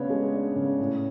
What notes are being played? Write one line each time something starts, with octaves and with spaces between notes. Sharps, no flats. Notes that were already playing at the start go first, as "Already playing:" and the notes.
Already playing: C#3 B3 D4 C#5
G#3
D4
C#3
A2